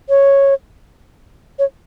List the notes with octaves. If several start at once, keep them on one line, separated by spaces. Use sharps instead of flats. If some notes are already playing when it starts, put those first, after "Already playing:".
C#5
C#5